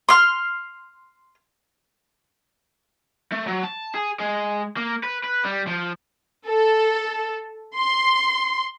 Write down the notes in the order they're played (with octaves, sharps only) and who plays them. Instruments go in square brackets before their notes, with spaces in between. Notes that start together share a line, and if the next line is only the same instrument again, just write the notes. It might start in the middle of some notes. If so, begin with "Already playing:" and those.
[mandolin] C6 F6
[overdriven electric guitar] A3
F#3
A5
G#4
G#3
A#3
B4
B4
G3
F3
[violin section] A4
C6